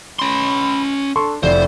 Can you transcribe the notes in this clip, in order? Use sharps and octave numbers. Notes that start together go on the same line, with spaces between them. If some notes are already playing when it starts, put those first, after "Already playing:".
C#4 B5 C6
D4 A4 C6 C#6
F1 E4 C5 D5